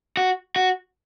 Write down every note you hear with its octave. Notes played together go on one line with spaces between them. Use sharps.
F#4
F#4